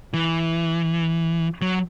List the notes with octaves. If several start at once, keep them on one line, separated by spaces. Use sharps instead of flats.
E3
F#3